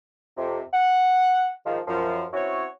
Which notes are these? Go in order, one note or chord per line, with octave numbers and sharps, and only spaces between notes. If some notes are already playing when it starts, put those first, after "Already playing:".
F2 C3
F#5
G#2 D#3 F3
F#2 F3
C4 C#4 E4 F#4 C#5